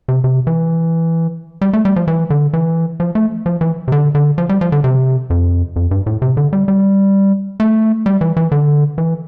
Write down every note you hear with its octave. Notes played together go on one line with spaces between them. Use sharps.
C3
C3
E3
G3
A3
G3
F3
E3
D3
E3
F3
A3
F3
E3
C3
D3
D3
F3
G3
F3
D3
C3
F2
F2
G2
A2
C3
D3
G3
G3
A3
G3
E3
E3
D3
E3